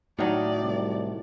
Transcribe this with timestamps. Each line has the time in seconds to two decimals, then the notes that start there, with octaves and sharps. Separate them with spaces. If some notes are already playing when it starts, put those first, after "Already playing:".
0.19 A2 D#3 F#3 D#4 D5
0.62 C2